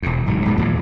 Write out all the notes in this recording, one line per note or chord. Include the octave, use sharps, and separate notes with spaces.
E1 E2
D1 G#2 F#3
A#1 G#2 B2 G#3
D#2 A#2 E3